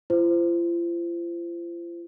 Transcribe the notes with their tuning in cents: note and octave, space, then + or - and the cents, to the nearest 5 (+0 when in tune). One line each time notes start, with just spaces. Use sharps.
F4 -40 C5 -15